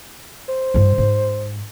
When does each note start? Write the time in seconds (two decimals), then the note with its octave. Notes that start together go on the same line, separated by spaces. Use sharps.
0.49 C5
0.74 G2 E4
0.98 G#2